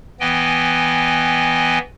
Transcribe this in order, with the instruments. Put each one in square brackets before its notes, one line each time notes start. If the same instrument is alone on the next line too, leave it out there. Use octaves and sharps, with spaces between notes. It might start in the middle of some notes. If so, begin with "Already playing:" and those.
[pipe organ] E3 B3 D#5 G5 G#5